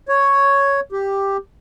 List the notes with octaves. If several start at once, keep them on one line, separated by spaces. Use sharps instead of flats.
C#5
G4